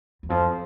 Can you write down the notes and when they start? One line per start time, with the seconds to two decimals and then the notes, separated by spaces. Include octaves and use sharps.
0.23 E2
0.30 F2 F3